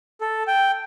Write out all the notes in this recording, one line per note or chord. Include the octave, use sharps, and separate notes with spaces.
A4
G5